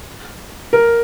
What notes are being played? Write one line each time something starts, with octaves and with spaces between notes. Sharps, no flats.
A#4